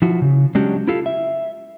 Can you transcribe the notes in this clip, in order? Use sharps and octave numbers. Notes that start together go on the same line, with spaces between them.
F3 E4 F#4
C#3
F#3 G#3 C#4 D4 F#4 G4
E4 F4 G4 A4 F5
E5